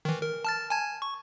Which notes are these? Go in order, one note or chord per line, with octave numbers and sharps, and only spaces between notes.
D#3 E3
A#4
A5 F6 A6
G#5 A5 G#6
C#6